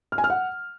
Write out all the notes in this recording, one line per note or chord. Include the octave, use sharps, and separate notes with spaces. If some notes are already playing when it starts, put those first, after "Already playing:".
F6
G#5
F6
F#5